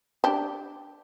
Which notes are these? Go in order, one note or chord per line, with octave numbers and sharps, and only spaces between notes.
D4 G4